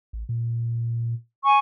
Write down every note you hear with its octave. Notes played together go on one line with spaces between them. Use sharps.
A1
A#2
G#5 C#6